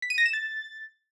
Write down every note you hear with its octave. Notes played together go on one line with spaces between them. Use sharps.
B6
D#7
A#6
E7
A6